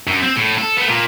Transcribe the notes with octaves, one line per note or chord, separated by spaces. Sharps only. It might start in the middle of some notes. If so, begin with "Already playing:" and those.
F#2
C4
A2
A4
A3 B3
A#2